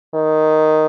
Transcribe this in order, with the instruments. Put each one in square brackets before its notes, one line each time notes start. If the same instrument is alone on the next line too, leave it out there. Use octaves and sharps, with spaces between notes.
[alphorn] D#3